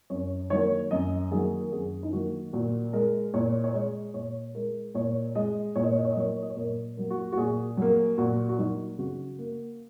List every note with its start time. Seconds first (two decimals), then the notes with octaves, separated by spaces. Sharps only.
0.10 F#2 C#5
0.50 D#3 F#3 A#3 C#5
0.91 F#2 D#5
1.31 D#3 F#3 A#3 G#4
1.61 A#4
1.72 F#2 G#4
2.03 D#4
2.13 D#3 F#3 A#3 F#4
2.53 A#2 F#4
2.93 G#3 A#4
3.34 A#2 C#5
3.64 C#5
3.74 G#3 D#5
4.14 A#2 C#5
4.55 G#3 A#4
4.95 A#2 C#5
5.35 G#3 D#5
5.76 A#2 C#5
5.83 D#5
5.91 C#5
5.98 D#5
6.05 C#5
6.12 D#5
6.16 F#3 A#3 C#5
6.42 D#5
6.50 C#5
6.57 A#2 A#4
6.97 F#3 A#3
7.10 F#4
7.32 F#4
7.37 A#2 G#4
7.77 F#3 A#3
8.18 A#2 F#4
8.49 F#4
8.59 F#3 A#3 D#4
8.99 C#3 F#4
9.39 A#3